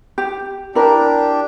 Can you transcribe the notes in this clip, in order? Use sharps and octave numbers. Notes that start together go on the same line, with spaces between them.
G4
D4 E4 G4 A#4